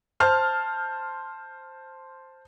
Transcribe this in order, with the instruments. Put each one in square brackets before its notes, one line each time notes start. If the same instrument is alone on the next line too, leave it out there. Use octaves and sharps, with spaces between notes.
[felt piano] C5 A5 F6